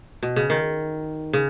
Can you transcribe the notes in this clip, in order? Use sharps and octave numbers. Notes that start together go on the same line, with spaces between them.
B2
C#3
D#3
C#3